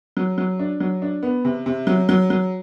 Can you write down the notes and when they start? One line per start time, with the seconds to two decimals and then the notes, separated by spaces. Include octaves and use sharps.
0.17 F#3
0.38 F#3
0.59 D4
0.80 F#3
1.02 D4
1.23 B3
1.45 C3
1.66 C3
1.87 F#3
2.09 F#3
2.30 F#3